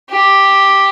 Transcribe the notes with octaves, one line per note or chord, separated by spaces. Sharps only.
G4